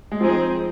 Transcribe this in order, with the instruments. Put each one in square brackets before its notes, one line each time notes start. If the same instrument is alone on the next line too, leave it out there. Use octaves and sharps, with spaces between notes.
[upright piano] G#3
[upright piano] F3 [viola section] C4 D#4 G#4 C5